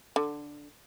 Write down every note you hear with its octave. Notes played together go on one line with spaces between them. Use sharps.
D3